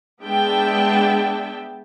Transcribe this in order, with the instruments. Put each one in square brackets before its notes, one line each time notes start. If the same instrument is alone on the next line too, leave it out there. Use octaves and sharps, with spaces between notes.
[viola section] G#3 B3 D4 E5 G5 A5